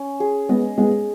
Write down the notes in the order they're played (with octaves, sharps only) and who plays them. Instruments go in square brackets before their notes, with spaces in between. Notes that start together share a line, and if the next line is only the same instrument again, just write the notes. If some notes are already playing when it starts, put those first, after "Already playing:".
Already playing: [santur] C#4
G#4
[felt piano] G#3 B3 [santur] D#5
[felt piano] G#3 B3 [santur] G#4